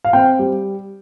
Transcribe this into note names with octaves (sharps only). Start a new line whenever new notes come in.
F5
C4 G5
G3